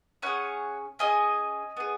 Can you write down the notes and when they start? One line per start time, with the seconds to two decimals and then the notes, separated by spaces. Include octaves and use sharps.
0.22 C#4 G#4 C#5 F#5
0.99 C#4 G#4 D#5 G#5
1.77 B3 G#4